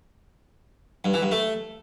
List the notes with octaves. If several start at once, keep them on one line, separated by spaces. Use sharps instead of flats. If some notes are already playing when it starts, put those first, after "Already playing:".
G2
E3
G2
A3